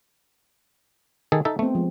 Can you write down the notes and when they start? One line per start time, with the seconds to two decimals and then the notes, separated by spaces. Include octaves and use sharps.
1.32 D#3 G#4 A4
1.45 D#4 A4 E5
1.59 A3 B3 C4
1.75 F3 G#3